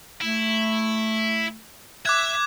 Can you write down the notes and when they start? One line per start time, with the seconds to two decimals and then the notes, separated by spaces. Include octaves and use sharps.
0.21 A3 E4
2.05 E5 D6 F#6 G#6